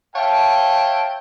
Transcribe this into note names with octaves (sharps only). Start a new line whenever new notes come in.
C#5 E5 F5 G5 A5